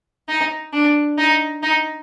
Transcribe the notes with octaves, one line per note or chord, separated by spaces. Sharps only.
D#4
D4
D#4
D#4